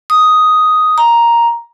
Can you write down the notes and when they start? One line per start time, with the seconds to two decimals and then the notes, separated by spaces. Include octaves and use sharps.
0.10 D#6
0.98 A#5